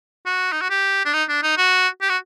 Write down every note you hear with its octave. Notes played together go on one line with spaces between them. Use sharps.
F#4
D#4
F#4
G4
D4
D#4
D4
D#4
F#4
G4
F#4